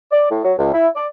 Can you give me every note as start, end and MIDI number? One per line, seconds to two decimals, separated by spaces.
0.11 0.26 74
0.30 0.43 45
0.44 0.53 54
0.58 0.72 37
0.73 0.87 64
0.95 1.06 74